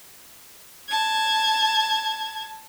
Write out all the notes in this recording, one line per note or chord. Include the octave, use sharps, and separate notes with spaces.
A5 G#6